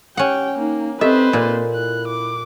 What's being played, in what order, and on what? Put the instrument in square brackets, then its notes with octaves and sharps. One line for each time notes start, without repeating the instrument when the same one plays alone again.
[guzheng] C#4 F#5 [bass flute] G4 [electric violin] G5
[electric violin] A#3 [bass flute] D#4
[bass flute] C4 [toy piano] G4 A4 D#5 [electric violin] B4 C5 [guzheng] E5
[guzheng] A#2 [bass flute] A#3
[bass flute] E4 [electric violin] F#6
[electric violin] D6